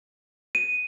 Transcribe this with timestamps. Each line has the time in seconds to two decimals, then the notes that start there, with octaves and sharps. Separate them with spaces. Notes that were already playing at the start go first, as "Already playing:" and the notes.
0.55 D#7